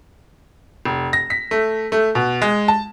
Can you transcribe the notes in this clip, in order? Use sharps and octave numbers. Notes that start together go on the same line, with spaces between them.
F1
A#6
B6
A3
A3
B2
G#3
A5